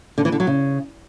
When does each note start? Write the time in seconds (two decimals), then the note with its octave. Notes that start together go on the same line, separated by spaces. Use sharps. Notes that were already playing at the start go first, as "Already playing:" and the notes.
0.18 D3
0.25 E3
0.32 D3
0.40 F#3
0.47 C#3